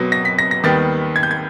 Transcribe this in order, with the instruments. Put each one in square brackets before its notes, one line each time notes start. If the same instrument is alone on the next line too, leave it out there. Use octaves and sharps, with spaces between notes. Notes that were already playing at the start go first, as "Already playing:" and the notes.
Already playing: [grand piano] B2 F#3 B3 A#6
A#6
B6
A#6
A#6
D#2 D#3 G3 B3 A6
G#6
G6
G#6